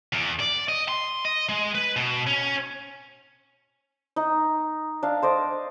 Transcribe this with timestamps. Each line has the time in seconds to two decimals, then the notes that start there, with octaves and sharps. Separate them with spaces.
0.13 E2
0.40 D5
0.68 D#5
0.89 C6
1.25 D#5
1.49 G#3
1.75 B4
1.97 B2
2.27 C#4
4.16 D#4
5.03 D4 F5
5.22 C5 D5 D#5